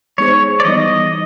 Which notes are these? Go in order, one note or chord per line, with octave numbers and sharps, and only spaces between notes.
G#3 B3 D#4 G#4 C5 C#5
D5
E3 G3 B3 D#4 D#5